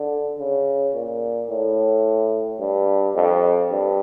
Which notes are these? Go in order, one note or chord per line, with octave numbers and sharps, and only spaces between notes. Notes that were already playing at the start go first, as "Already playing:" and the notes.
Already playing: D3
C#3
A#2
A2
G2
F2
G2